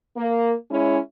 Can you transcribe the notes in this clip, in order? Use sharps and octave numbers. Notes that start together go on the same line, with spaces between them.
A#3
G#3 C#4 E4